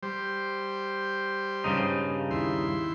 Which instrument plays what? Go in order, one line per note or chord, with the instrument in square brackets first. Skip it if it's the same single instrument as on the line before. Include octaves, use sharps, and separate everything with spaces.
[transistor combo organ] G3 C5
[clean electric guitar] G2 C#3 D#4
[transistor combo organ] D#2 E4 C6